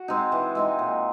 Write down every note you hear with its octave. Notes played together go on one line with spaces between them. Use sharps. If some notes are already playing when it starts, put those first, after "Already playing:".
Already playing: F#4
G#3 C4 D#4
E3
G#3 C4 D#4
A#2